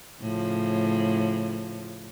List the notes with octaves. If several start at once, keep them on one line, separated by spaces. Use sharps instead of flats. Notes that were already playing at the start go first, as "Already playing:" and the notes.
A2 C#3 F3